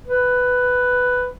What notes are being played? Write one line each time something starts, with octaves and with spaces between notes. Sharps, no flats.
B4